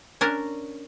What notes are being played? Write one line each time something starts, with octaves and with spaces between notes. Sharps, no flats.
C#4 D4 A#4